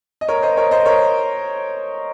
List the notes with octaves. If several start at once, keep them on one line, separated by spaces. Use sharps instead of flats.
D#5
A#4 C#5
C5 D#5
A#4 C#5
C5 D#5
A#4 C#5